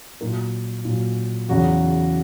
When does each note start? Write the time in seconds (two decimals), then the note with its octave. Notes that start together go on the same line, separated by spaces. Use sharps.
0.20 A#2 F#3 A#4
0.85 A#2 F#3
1.49 E2 C#3 F#3 F#4